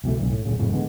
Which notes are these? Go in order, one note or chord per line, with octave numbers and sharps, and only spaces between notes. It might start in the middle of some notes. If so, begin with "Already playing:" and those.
C#2 B2 E3 A3
B1 G2 E3
A2
D#1 A#2 C#3
F#1 F2 A2 C#3
D3 E3 G#3 B3